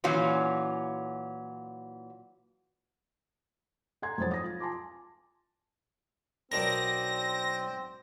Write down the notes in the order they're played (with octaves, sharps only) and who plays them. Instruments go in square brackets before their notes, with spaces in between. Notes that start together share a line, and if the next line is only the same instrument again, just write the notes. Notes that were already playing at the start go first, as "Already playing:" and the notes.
[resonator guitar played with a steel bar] A#2 E3 F#3 C#4 F4 F#4
[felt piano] A4 F#5 G#5 A#5 C6 G#6
F2 G#2 F#3 C5 A6
D#6 A#6
F4
G#5 A5 C6 D6
[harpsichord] B1 D4 A#4 [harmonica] C4 [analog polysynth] A#6